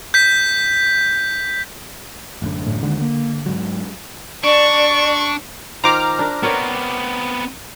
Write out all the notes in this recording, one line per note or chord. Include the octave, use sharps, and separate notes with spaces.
G6 B6
A1 F#2 D3
A2
D#2 D3 D#3 G#3
A#3
G#2 F#3
D4 D5 C#6
D#3 F4 C5 A#5 D6 F6
D4 A#4
B3 C4 A#4 C#5 D5